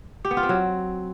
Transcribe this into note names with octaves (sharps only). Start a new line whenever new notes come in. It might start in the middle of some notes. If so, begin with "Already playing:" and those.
G4
B3
F4
C4
F#3